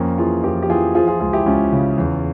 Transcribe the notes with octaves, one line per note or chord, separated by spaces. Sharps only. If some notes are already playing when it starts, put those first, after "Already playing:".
Already playing: F2 A#3 C#4
E3 F4 G#4
F2 G4 A#4
G4
E3 F4 G#4
F3 F4 G#4
F4 G#4
C#2 F4 G#4
E4 G4
C#2 C#4 F4
C#3
E2